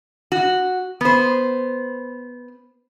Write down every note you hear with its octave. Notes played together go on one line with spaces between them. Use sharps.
F#4
B3 C5